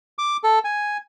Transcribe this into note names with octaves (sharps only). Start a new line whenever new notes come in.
D6
A4
G#5